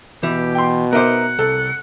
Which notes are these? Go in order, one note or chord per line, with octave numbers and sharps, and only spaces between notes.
B2 E3 G4
G5 C6
B3 D#4 A#4 C5 E5 F#5 D6
C2 A4